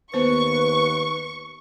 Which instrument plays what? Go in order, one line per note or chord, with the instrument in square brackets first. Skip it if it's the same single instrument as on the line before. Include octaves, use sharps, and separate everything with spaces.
[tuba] D#2 [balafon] B3 C5 [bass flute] B4 [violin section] C#6